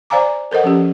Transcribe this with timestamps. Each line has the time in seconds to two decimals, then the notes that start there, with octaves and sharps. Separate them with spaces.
0.10 C5 D5 F5 G#5 A#5 D6
0.51 A4 A#4 C5 D#5 F#5
0.64 F3 C#4 G4